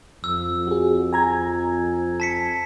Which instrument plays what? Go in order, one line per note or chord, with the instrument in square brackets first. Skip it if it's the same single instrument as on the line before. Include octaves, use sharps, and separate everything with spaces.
[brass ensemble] F2 [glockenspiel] E6
[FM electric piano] F#4 G#4
G#5 A#5 G#6
[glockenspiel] A5 B6 C#7